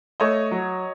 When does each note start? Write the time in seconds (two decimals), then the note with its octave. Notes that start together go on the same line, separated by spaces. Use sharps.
0.20 A3 C#5 D#5
0.51 F#3